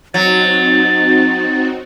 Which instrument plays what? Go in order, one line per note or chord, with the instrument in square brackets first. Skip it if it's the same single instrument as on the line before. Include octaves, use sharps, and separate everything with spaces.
[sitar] F#3 [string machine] C4 D#4 F#4 [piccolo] A6